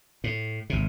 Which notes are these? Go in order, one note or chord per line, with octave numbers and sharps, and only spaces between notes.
A2
G#1 C3